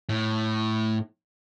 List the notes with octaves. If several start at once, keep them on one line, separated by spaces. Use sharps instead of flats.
A2